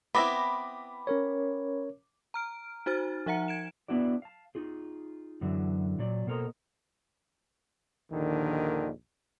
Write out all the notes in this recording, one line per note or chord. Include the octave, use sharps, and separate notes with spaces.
B3 C4 E4 B5 D6 A#6
C#4 A#4 C#5
A#5 F6 D7
D#4 F#4 C5 F6 A6
F3 D#4 E5 F#5 A#5 C#7
G#6 D7 E7
B3 D4 E4 F#4 D5
F5 A5
D#4 F4 G#4
F#2 D3 E3 F#3
A#2 F#3 D5
B2 A#3 A4 A#4 C5 D#5
A#1 D#2 D3 D#3